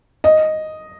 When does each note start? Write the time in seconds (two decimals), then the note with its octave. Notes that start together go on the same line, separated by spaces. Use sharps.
0.24 D#5